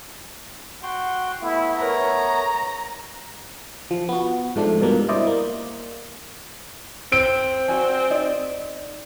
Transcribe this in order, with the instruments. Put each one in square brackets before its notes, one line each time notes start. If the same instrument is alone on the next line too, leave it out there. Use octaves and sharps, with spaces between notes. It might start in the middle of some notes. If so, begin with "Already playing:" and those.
[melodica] F#4 G5 C6 [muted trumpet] F#5
[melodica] A3 B3 [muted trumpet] E4
[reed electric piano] A#4 B4 B5 [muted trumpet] C#5 [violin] A#5
[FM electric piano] F3
B3 F#4
G#2 F3 A3 D4
G2 B2 G3 A#3
E4 C5 D5 D#5
A#3
[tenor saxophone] C4 [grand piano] D7
[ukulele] F#4 D5 G#5
D#4 D5